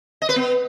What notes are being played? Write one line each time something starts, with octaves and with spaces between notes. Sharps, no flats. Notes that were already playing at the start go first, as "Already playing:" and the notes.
D#5
B4
B3